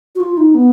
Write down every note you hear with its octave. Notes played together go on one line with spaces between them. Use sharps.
F#4
F4
D#4
B3